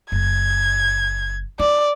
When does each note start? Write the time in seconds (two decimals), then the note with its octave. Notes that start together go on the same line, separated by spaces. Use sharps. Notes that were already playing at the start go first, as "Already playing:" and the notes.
0.12 F#1 G#6
1.59 E4 D5